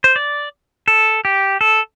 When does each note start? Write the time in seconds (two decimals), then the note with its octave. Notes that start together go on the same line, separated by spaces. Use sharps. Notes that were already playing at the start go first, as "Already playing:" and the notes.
0.04 C5
0.16 D5
0.88 A4
1.25 G4
1.61 A4